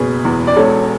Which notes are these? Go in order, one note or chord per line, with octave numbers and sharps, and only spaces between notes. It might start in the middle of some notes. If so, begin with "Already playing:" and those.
Already playing: F#1 B2 G#4 B4
E2
D5
E1 A4 C#5